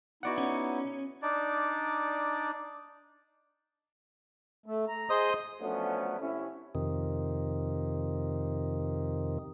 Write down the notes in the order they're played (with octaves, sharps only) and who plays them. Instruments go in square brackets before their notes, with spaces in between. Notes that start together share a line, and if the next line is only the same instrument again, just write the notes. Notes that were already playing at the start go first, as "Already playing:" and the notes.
[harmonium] B3 D#4 E4 [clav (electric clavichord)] F#4 D5 F#5
[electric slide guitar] C#4
[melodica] D4 D#4 D5
[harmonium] A3
A#5
[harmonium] G#4 [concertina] C5 D#5 D#6
[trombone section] F3 F#3 A3 B3 C#4 D4
C3 C#4 E4
[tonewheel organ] F2 C3 D#3